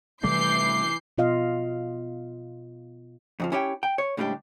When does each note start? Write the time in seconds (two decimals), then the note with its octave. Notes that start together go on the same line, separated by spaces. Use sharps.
0.24 C3 E3 G3 A3 D6 G6 C7
1.18 B2 B3 F4 D#5 F5
3.40 F2 C#3 F3
3.52 C#4 E4 G4 C#5 G5
3.83 G5
3.98 C#5
4.17 A2 C#3 G3 G#3 D4 G4